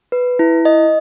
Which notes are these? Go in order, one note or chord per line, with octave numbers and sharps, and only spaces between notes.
B4
E4
D#5